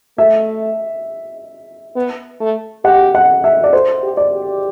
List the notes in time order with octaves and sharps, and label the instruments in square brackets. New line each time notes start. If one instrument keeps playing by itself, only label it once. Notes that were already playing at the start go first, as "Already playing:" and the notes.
[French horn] A3 [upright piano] E5
[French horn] B3
A3
[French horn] G4 [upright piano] F#5
[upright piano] F#5
E5
D5
[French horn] A4 [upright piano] C5
[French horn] G4
[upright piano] D5
[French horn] G4